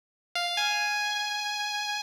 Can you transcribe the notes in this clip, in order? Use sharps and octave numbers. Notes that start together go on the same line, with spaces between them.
F5
G#5